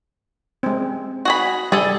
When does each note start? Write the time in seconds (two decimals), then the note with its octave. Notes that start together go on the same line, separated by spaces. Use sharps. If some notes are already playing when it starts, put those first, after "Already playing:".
0.63 G#3 C4
1.25 F#4 G#4 B5
1.72 G3 G#4 A4